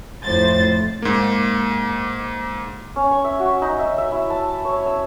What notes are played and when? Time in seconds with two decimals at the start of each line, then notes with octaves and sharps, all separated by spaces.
0.24 F2 A2 C5 A6
1.02 G#2 A#3
2.96 C#4
3.11 C#6
3.24 E5
3.39 F#4
3.62 D#4
3.79 E5
3.98 E5
4.12 E4
4.30 A5
4.65 C#5
4.86 E6